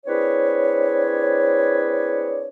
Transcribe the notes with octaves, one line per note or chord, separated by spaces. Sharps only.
C4 D4 E4 G#4 B4 C#5